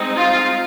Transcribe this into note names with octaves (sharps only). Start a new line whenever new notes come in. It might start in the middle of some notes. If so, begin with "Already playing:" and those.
Already playing: G#3 C4 D#4
F4